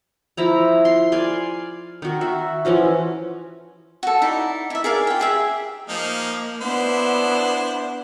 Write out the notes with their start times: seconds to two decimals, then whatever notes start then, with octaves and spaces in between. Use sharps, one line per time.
0.37 F3 E4 A#5
0.85 C6
1.12 D5 F5 G#5 C6
2.02 D#3 F#4
2.21 F#4 E5
2.65 E3 F3 C#4 F#4
4.03 F#4 A4
4.22 D#4 E4 D5
4.70 E4 E5
4.84 G#4 A#4 D5 F5
5.07 F4 G5
5.20 G4 G#4 E5
5.89 F3 A#3 D#4
6.61 B3 D4 E4 C5